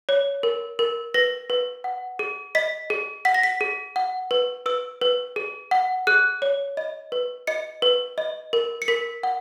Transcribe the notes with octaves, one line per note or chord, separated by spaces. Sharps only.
C#5
A#4
A#4
B4 A#6
B4
F#5
G#4
D#5 B6
G#4
F#5 B6
A#6
B6
G#4
F#5
B4
B4 E6
B4
G#4
F#5
G#4 F#6
C#5
D#5
B4
D#5 C#7
B4
D#5
A#4
C#7
A#4 B6
F#5